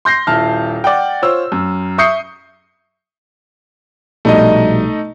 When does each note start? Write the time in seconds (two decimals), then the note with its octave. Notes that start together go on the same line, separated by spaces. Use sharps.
0.05 C6 G6 A#6 C7
0.27 D#1 E4 A5 F6
0.84 D5 F#5 G5
1.22 F4 C5 C#5 E6
1.52 F#2
1.98 E5 C#6 D#6 G6 C7 C#7
4.25 A#1 B2 G3 A3 D#4 D#5